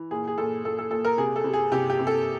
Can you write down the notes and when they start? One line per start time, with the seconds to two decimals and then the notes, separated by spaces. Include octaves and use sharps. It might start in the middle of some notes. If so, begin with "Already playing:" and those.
Already playing: E3
0.11 A#2 G#4
0.28 G#4
0.38 A#2 A4
0.64 A#2 A4
0.78 A4
0.91 A#2 A4
1.05 A#4
1.18 C3 G#4
1.36 A4
1.44 C3
1.53 G#4
1.72 C3 G4
1.90 G4
1.99 C3
2.07 A4